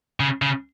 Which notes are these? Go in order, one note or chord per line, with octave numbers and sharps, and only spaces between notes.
C#3
C#3